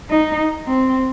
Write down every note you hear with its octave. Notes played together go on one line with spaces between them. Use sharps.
D#4
C4